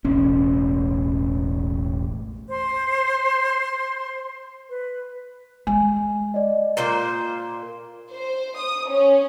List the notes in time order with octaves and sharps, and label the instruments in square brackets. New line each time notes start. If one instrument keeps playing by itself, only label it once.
[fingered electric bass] E1 A1 C#4
[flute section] C5 C6
B4
[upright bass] G#3 [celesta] G#5
[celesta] D5 D#5
[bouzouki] A#2 A#3 C5
[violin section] C5
D#6
C#4